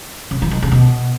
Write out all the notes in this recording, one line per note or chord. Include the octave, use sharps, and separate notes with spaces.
C#3
E3
D#3
C#3
B2